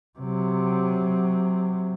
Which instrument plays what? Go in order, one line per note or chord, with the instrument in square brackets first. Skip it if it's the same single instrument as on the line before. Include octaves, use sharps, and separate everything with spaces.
[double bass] C3 F#3